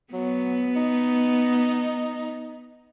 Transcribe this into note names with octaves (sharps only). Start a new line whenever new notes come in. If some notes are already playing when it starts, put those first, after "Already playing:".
F#3 B3
D#4